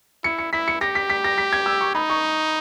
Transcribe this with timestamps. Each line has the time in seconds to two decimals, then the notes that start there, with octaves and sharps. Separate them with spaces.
0.24 E4 C#7
0.38 C#7
0.53 E4 B6
0.68 C#7
0.81 G4 A#6
0.95 B6
1.10 B6
1.24 A#6
1.38 B6
1.53 G#6
1.66 E6
1.81 C#6
1.95 D#4 B5
2.10 C#6